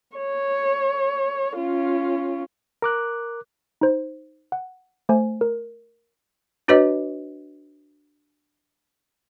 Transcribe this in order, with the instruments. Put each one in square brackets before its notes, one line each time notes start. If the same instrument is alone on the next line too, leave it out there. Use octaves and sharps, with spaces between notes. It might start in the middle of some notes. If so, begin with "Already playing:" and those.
[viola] C#5
C#4 F4
[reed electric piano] A#4 D6 F#6
[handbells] D#4 C5
F#5
A3 C5 G#5
A#4
[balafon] D4 F#4 B4 C#5 D#5